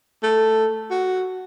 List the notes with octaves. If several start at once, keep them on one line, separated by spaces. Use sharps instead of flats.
A3
F#4